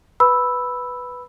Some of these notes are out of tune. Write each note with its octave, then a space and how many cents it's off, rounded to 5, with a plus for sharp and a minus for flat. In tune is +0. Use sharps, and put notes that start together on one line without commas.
B4 +0 B5 +0 E6 +0